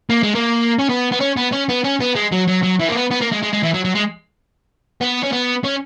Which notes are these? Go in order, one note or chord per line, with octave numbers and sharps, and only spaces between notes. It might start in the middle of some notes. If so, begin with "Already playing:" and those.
A#3
G#3
A#3
C#4
B3
B3
C#4
B3
C#4
B3
C#4
B3
G#3
F#3
F#3
F#3
E3
A#3
B3
B3
A#3
G#3
G#3
G#3
E3
F#3
F#3
G#3
B3
C#4
B3
C#4